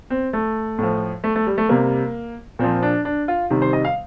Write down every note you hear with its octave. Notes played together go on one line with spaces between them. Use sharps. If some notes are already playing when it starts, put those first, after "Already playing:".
C4
A3
A2 F3
A3
A3
G3
A3
C3 G3 A#3
A#2 F3 C4
D4
D4
F4
C3 D#3 G3
C5
D#5
F5